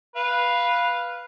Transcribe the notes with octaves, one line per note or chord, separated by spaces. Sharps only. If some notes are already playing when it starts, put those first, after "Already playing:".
B4 F5